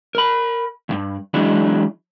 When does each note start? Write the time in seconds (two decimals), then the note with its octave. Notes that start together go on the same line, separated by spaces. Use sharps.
0.15 A#4 B5
0.89 D2 G2
1.34 E3 F#3 G#3 D4 E4